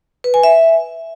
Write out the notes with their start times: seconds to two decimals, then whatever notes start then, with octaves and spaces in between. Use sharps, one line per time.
0.24 B4
0.34 G#5
0.43 E5